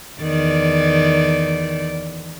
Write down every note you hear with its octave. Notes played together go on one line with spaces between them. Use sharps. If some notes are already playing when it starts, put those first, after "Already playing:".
E2 D#3 D5